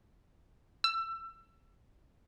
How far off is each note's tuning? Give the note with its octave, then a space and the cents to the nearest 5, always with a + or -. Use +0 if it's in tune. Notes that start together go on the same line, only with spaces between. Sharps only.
E6 +25